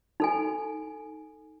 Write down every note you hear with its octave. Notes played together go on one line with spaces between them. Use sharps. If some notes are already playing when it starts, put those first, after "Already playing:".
D#4 A4 G#5